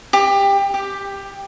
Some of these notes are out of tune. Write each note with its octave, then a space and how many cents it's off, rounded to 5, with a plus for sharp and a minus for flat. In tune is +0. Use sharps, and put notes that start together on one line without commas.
G4 +20
G4 +10